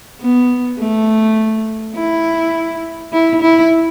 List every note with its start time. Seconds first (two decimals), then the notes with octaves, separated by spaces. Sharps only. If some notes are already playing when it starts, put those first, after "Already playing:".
0.20 B3
0.79 A3
1.95 E4
3.13 E4
3.42 E4